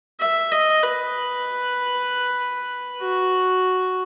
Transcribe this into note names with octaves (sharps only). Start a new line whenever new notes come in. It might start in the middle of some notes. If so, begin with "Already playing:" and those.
E5
D#5
B4
F#4